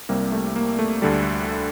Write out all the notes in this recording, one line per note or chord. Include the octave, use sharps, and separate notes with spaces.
C2 C3 G3 A#3
A3
A#3
A3
D2 D3 G3 A3